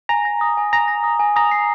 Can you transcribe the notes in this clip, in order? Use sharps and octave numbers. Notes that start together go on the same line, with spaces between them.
G#5 A#5
A#6
D#6
G#5
G#5 A#5
A#6
D#6
G#5
A#5 D#6
C7